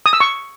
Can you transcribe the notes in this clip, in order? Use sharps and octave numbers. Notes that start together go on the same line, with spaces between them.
D#6
E6
C#6